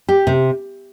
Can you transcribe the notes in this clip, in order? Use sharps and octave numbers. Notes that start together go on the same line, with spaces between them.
G4
C3